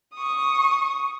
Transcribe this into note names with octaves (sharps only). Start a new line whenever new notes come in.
C#6 D#6